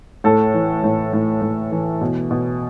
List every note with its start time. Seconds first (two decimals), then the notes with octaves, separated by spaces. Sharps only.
0.24 A2 A4
0.54 E3
0.84 A2
1.13 A2
1.42 A2
1.72 E3
2.01 B2
2.31 B2